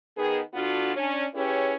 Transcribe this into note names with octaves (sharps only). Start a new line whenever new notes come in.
D#3 B3 G#4
D3 B3 D4 F4 F#4
C#4 D4
C#4 E4 G4 G#4 B4 C#5